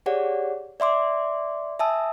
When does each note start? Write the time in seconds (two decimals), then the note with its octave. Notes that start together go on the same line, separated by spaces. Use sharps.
0.06 G4 G#4 C#5 D5 F#5
0.80 D5 E5 C6 D6
1.79 E5 G#5 A5 D#6 E6